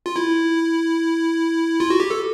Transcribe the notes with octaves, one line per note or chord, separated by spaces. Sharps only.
F4
E4
F4
F#4
G4
A4